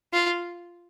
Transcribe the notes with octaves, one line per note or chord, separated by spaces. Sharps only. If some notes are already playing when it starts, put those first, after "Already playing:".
F4